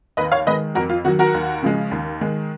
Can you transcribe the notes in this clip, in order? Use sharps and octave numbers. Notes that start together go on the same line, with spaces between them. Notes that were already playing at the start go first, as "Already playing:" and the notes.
D#2 B4 D#5
C#5 F5
D#3 G#3 B4 D#5
F2 F#4 A#4
F4
D#3 F#3 F#4
F#4 A#4
D#2
C#3 F3 G#3
D#2
D#3 G#3